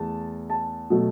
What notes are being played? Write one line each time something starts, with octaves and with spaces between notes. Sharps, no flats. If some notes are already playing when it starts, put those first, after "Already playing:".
Already playing: E2 A3 A5
A5
B2 F#3 A3